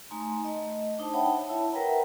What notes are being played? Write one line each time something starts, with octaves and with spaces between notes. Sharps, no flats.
A3 D#4 G#5 A#5 C6
A3 D#5
D4 D#4 C5 A5
C#5 E5 F#5 G5 A5 B5
E4 C#5 E5 A5 B5
A#4 B4 E5 F#5 G5 A#5